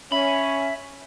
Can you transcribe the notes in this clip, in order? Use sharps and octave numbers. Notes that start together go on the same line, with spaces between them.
C#4 E5 B5